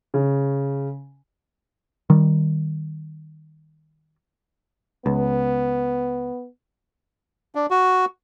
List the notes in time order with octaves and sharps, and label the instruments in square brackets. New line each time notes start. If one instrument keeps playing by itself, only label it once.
[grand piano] C#3
[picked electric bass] D#3 G3
[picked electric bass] C#2 [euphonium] B3
[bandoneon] D4
F#4